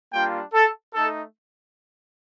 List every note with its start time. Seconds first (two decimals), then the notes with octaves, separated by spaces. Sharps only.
0.13 G3 A#3 D4 F4 G5
0.54 A4
0.94 A3 D#4 A4